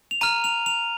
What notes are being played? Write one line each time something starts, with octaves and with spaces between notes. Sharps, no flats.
F7
A#5 F6 D#7
F7
F7